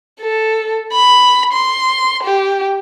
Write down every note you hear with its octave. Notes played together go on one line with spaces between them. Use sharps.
A4
B5
C6
G4